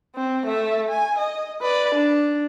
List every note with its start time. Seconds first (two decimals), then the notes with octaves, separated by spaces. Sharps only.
0.16 C4
0.46 A3 E5
0.89 G#5
1.19 D#5
1.62 B4 D5
1.95 D4